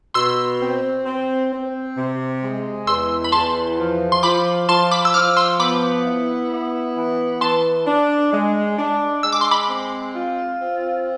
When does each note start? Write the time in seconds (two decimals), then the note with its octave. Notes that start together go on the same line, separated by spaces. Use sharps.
0.14 B2 C6 E6
0.60 C4
1.06 C4
1.51 C4
1.96 C3
2.42 G#3
2.87 E2 C6 E6
3.24 B5
3.32 E2 A5 C6
3.78 F3
4.12 C6
4.23 F3 B5 D6
4.68 F3 A5 C6
4.91 B5 D6
5.05 E6
5.14 F3 D6 F6
5.37 C6 E6
5.59 B3 B5 D6
6.05 E4
6.50 B3
6.96 E3
7.41 E3 A5 C6
7.86 D4
8.32 G#3
8.78 D4
9.23 G#3 E6
9.32 D6
9.41 C6
9.51 B5 D6
9.68 C4
10.14 F4
10.59 C4